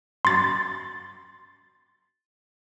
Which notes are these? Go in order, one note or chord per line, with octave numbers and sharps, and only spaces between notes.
C6 A6